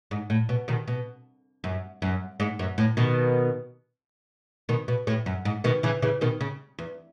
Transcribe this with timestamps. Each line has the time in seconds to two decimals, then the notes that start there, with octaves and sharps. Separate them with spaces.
0.11 G#2
0.30 A2
0.49 B2
0.68 B2 D#3
0.88 B2
1.64 F#2
2.02 F#2
2.40 G#2
2.59 F#2
2.78 A2
2.97 B2 D#3
4.69 B2 D#3
4.88 B2
5.07 A2
5.26 F#2
5.45 G#2
5.64 B2 D#3
5.83 C#3 E3
6.02 C#3 E3
6.21 B2 D#3
6.41 C#3
6.78 E2